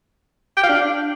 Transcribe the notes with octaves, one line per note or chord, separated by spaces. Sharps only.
G5
F5
D4